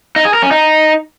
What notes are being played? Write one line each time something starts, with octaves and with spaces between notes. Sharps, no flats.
D#4
G#4
A#4
C#4
D#4